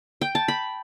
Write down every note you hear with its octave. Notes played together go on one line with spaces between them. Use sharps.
G5
A5
B5